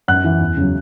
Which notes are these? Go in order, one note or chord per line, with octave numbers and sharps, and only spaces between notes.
F#2 F#5 F#6
E3
E2
C#3 F#3